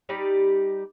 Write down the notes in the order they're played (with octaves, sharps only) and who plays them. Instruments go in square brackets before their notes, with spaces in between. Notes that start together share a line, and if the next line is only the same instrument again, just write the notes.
[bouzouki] G3 D#4 G4 D5